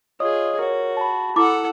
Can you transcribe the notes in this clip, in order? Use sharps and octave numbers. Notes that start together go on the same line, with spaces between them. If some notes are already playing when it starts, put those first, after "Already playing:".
F4 G#4 C#5 D#5 D#6
F#4 A#4 C#5
A5 B5
E4 A4 F#5 D6